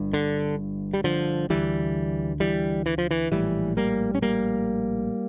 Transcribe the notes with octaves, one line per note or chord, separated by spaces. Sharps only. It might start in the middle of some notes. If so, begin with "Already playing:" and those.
Already playing: G1 G2
D3
G3
D3 F3
D2 D3 E3 G3
E3 G3
E3
F3
E3
A#1 A2 E3 G3
G3 A#3
C#4
G3 A#3